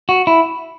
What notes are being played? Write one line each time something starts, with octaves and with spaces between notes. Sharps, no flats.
F#4
E4